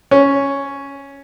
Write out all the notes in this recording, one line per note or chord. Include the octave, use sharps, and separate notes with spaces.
C#4